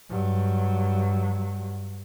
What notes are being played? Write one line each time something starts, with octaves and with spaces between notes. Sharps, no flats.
G2 F#3